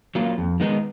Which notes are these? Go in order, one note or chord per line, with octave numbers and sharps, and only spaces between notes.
F#3 A#3 F4
F2
D#3 G#3 B3 D#4